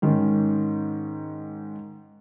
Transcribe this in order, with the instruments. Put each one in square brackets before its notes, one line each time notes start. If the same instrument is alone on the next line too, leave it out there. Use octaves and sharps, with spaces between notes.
[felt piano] G#2 D#3 C#4